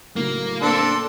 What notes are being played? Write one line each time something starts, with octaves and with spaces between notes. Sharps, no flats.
A2 C#3 F#3 A#3
C4 D4 A4 C6